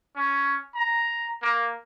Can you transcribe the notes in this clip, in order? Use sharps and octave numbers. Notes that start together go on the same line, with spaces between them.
C#4
A#5
A#3